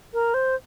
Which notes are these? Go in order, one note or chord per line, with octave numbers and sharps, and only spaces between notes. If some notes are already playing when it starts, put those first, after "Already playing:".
A#4
C5